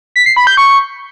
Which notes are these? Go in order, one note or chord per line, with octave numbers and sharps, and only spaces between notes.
B6
C7
B5
G6
C#6